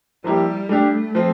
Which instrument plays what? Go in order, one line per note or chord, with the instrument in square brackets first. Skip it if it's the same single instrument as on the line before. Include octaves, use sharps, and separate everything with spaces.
[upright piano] F3 A#3 E4 G4 [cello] G3
[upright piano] G3 D4 G4 [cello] A3
[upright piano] F3 C4